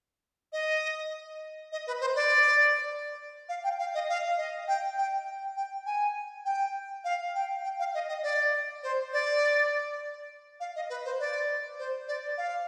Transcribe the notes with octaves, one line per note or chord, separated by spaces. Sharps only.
D#5
D#5
B4
C5
D5
F5
G5
F5
D#5
F5
D#5
G5
G5
G5
G#5
G5
F5
G5
G5
F5
D#5
D#5
D5
C5
D5
F5
D#5
B4
C5
D5
C5
D5
F5